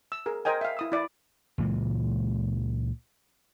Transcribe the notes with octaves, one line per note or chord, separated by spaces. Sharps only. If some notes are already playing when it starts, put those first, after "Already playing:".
E6
G#4 A#4
A#4 C5 D#5 G5 G#5
E5 F5
E4 D#6 E6
E4 D5
C#2 A#2 E3 G#3